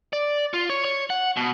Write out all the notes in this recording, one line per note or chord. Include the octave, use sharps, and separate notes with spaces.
D5
F4
C#5
C#5
F#5
B2